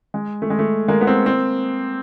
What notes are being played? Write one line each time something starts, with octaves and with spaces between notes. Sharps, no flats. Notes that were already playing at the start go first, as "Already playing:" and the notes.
G#3
A3
G#3
A3
G#3 A#3
B3
A#3 C4
A#3 C4